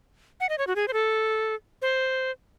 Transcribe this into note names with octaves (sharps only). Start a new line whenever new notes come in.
F#5
D#5
C#5
F#4
G#4
C5
A4
C5